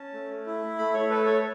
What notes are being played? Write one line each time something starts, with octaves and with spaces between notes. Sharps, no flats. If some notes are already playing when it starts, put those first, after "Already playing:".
Already playing: C#4 A5
A3
E4
A3 B5
C#5
A4 B4
C#5